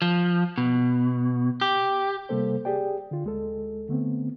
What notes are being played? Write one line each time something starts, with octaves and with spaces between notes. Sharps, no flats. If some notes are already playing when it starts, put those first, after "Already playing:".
F3
B2
G4
C3 G3 A#3 A4 C5
G4 G#4 D5 G5
D3 F4
D2 G#3 A4
D3 A3 B3 C4